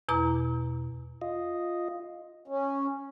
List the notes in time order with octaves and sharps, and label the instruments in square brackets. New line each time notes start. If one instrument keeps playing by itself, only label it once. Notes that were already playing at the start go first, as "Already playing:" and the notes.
[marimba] E2 B2 E4 A#5 D6
[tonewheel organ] F4 D#5
[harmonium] C#4